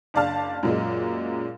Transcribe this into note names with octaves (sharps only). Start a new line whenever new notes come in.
F#1 D4 D5 F5 A5 F6
F#2 A#2 G#3